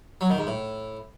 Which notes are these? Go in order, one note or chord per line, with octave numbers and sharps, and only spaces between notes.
F#3
D#3
G#2
A2